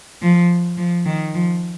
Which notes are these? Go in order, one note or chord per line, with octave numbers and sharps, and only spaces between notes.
F3
F3
D#3
F3